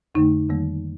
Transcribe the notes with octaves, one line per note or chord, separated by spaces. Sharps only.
F2 D3 A3 D#4
F2 D#3 G3 A#3